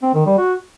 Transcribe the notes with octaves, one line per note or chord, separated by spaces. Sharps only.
C4
D#3
G3
F#4